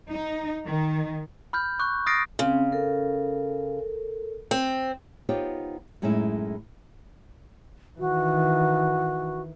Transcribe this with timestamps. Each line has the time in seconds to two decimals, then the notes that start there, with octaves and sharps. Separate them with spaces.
0.10 D#4
0.65 D#3
1.53 B5 F6 G6
1.79 C#6 D6 F#6
2.06 D#6 F6 A6 A#6 C7 D7
2.39 C#3 C4 C#4
2.72 A4 A#4
4.51 C4
5.29 B3 D#4 F4 G4 C5 C#5
6.02 F#2 A2 G#3 C#4 D#4 E4
7.99 D#3 E3 F#4